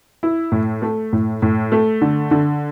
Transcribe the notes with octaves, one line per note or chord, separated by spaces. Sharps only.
E4
A2
A3
A2
A2
A3
D3
D3